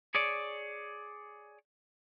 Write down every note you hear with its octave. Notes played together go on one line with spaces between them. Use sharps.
G#4 C#5 D5